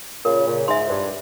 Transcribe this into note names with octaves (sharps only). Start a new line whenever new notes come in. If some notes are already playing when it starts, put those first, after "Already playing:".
A#2 C#3 A#4
A#2 C#3
G#2 E5 G#5 C6
G2